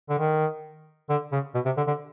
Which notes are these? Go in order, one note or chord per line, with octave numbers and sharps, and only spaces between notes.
D3
D#3
D3
C#3
B2
C3
D3
D3